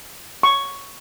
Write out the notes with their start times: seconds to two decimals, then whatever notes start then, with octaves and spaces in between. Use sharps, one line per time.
0.43 C#6